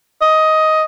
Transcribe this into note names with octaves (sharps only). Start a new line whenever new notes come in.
D#5